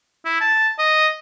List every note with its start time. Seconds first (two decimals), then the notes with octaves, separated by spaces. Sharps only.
0.25 E4
0.41 A5
0.79 D#5